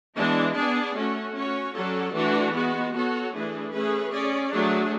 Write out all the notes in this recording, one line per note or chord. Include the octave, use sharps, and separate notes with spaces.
E3 G#3 B3 D4
B3 D4 G#4 D5
A3 C#4 F#4
C#4 F#4 C#5
F#3 C#4 F#4 A4 D5
E3 A3 D4 F#4
G#3 B3 F#4
B3 F#4 A4 C#5
E3 A3 D4 G#4 B4
A3 C#4 G#4 B4
C#4 G#4 D5
F#3 A3 D4 G#4